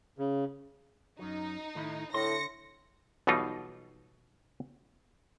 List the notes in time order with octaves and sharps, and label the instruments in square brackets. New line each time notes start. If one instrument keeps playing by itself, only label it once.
[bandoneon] C#3
[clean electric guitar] F#2 F#3 [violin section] D#4
[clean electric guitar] A2 D#3 E4
[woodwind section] A2 [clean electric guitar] D3 C6 [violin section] A#6 C#7
[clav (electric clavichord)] B1 B2 E3 G3 D#4 F4